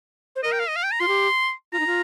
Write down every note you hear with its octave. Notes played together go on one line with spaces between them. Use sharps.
C5
A#4 D#5
G5
F5
D#5
F5
G5
A#5
F4 C6
G4
F4 A#5
D#4
F4